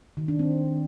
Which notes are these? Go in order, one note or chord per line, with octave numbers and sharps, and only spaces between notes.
D#3
D4
C4